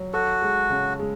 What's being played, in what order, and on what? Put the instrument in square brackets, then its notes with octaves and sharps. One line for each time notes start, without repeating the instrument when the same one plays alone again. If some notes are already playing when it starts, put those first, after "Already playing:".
Already playing: [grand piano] F#3
[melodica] F#4 [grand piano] A4
[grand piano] G#3
C#3
G#3